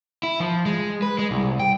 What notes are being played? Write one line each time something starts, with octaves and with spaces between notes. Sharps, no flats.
E4
F3
G#3
B4
G#3
C2
G5